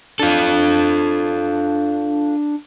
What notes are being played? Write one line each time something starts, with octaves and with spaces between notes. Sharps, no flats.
D4 F4 A4